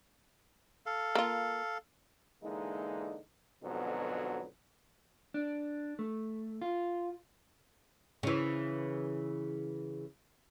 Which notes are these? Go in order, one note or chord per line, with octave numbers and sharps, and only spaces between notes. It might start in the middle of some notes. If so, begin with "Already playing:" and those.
A4 F5
A#3 F4
D3 E3 G#3 A#3 D#4
F2 G#2 B2 D3 F#3 B3
D4
A3
F4
C#3 E3